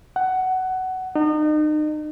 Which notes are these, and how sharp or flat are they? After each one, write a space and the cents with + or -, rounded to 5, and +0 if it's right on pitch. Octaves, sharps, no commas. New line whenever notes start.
F#5 +15
D#4 -35